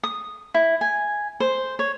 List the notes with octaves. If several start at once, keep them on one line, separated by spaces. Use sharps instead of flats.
D#6
E4
G#5
C5
C#5